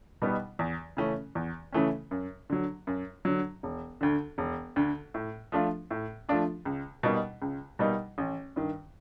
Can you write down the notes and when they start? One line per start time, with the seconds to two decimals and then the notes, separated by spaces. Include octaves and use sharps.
0.22 B2 G3 B3 D#4
0.59 E2
0.97 C#3 E3 A3 C#4
1.35 E2
1.72 C#3 E3 A3 C#4
2.11 F#2
2.50 D3 F#3
2.87 F#2
3.25 D3 F#3
3.63 E1
4.01 D2 D3
4.38 E1
4.76 D2 D3
5.14 A2
5.52 F3 A3 D4 F4
5.91 A2
6.29 F3 A3 D4 F4
6.65 C#2
7.03 B2 G3 A#3 D#4
7.42 C#2
7.79 B2 G3 A#3 D#4
8.18 A1
8.56 G2 D#3